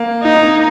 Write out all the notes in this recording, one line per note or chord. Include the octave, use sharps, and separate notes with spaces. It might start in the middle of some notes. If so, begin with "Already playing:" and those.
Already playing: A#3
D#4
A#3